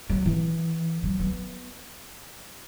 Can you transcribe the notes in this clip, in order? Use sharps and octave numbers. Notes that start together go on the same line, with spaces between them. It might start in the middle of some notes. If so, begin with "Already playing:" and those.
F#3
E3
F#3
B3